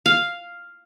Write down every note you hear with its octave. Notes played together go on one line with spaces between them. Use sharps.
F5